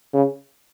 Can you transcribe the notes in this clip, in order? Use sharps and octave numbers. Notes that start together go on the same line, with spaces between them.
C#3